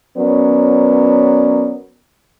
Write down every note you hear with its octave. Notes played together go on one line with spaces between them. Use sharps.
F#3 B3 C#4 A#4 D5